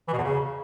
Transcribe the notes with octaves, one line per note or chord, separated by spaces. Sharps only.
E3
B2
E2
C#3